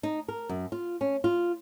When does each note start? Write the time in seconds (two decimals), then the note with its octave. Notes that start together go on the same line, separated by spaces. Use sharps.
0.03 D#4
0.28 A#4
0.49 F#2
0.72 F4
1.01 C#4
1.24 F4